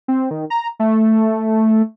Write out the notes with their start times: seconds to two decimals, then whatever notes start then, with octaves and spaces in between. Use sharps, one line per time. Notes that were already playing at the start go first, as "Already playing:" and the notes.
0.08 C4
0.31 D#3
0.50 A#5
0.80 A3